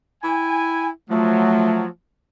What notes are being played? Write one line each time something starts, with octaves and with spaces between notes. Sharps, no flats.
E4 G5 G#5
F3 F#3 A3